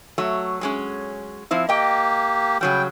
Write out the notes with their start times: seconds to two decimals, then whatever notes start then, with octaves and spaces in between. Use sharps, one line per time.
0.18 F#3 A3
0.61 F#3 G#3 C#4
1.51 F3 C4 E4
1.69 A#3 G4 D#5 G5
2.61 C#3 F#3 G3 G5